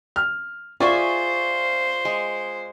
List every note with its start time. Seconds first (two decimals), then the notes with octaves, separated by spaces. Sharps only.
0.16 F6
0.80 F4 G#4 C5 D5 E5 G#5 C#6
2.05 G#3